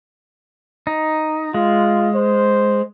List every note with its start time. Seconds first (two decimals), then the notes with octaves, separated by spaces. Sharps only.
0.87 D#4
1.54 G#3 F4
2.15 C5